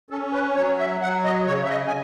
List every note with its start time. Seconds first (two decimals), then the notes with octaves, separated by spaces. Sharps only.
0.10 C#4 A4
0.33 B4
0.55 F#3 C#5
0.79 E5
1.01 F#3 F#5
1.24 D#5
1.47 C#3 C#5
1.64 E5
1.69 D#5
1.87 G#5